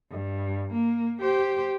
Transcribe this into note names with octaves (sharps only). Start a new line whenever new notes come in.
G2
A#3
G4 C5